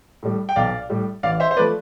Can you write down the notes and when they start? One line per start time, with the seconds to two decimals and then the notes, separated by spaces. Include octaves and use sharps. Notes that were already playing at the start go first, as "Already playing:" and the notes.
0.23 A2 G3
0.49 G5
0.56 B1 D5 F5
0.90 A2 G3
1.23 A1 D5 F5
1.40 C5 E5
1.51 C5
1.57 F3 A3 B4 D5